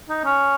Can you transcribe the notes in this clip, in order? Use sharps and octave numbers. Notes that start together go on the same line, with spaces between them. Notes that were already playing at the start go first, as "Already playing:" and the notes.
D#4
C#4